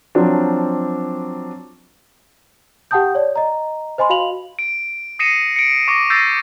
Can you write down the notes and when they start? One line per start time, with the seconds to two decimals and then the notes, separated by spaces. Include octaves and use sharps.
0.15 F3 F#3 C4 D4
2.91 G4 F#5 G5 A5 D#6 G6
3.15 C#5 D5
3.36 D#5 A#5
3.98 C5 D#5 G#5 B5 C6
4.10 F#4 F5 B5 F7 F#7
4.59 D7
5.19 D#6 A#6 C7 C#7 D#7 E7
5.56 C#7 D7
5.88 C#6 D6 A#6
6.10 E6 G6 A6 A#6 C7 D#7